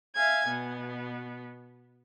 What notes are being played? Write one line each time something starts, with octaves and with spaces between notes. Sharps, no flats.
E5 F5 G#5 G#6
B2 B3